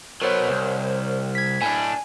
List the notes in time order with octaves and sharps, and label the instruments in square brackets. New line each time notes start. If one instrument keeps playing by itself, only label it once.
[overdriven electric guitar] F#3 B3 [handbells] A#4 C5 C#5
[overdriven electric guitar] C2
[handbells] G#6 B6
[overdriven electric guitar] A2 D4 [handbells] G#5